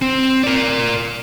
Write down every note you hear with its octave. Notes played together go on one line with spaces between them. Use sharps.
C4
A#4 D5